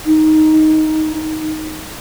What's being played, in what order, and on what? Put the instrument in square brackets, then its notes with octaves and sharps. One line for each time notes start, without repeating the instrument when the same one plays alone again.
[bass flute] D#4